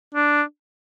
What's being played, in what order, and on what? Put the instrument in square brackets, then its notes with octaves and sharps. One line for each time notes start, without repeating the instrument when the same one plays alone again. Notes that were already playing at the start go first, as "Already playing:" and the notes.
[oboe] D4